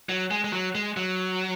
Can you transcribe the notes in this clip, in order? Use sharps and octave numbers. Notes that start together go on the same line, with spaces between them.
F#3
G#3
G#3
F#3
G#3
F#3